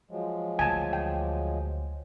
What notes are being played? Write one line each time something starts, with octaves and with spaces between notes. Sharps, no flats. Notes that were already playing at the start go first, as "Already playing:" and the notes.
F3 F#3 G#3
D2 G#5 A5
G5